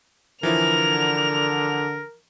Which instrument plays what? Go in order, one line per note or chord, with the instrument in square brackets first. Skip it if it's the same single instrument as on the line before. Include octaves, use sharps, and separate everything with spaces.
[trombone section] D3 [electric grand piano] E3 F3 E4 [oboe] A#4 [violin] F7